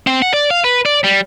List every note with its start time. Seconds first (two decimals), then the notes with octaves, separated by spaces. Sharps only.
0.07 C4
0.22 F#5
0.34 D5
0.51 F5
0.64 B4
0.86 D5
1.04 G3